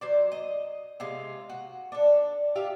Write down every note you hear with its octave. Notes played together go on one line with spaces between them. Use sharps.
F#3 C5 D5
D#5
C3 G#3 F4
F#4
D4 A4
F4 G4 E5 F5